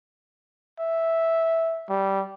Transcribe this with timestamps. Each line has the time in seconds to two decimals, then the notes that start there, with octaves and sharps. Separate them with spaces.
0.79 E5
1.89 G3